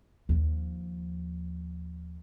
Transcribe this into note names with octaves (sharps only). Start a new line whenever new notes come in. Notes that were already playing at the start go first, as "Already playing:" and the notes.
D#2 F3